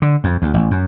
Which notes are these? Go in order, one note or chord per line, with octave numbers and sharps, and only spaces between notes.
D3
F2
D2
A1
F#2